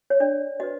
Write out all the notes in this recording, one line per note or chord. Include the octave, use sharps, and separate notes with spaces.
C#5
D4 D5
F#4 B4 D#5